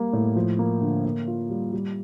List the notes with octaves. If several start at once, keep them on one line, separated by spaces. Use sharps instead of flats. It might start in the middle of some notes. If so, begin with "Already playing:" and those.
Already playing: G3 A#3
A2
F3
A#3
D3
A#3
F4
G3
G3